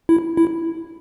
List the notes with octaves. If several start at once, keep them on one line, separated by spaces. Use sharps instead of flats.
E4
E4